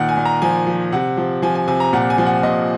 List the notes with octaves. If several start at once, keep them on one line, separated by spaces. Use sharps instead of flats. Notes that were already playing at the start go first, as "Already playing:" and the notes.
Already playing: A#2 D#3 F#5
G#5
A#2
A#5
F3 G#5
F3
C3 F#5
F3
F3 G#5
G#5
C3 G#5
A#5
A#2 F#5
G#5
F3
F#5
A#2 D#5